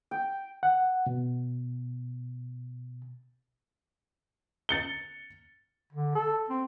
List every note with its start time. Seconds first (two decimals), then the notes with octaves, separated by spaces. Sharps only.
0.11 G5
0.63 F#5
1.06 B2
4.69 A6 C#7 G7
5.93 D3
6.15 A4
6.50 C4